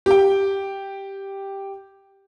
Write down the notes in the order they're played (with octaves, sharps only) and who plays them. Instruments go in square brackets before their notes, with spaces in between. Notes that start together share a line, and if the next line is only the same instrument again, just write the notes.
[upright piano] G4 G5